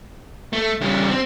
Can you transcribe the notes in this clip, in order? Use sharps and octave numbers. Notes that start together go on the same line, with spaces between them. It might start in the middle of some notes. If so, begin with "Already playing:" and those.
A3
C#3 G3
C4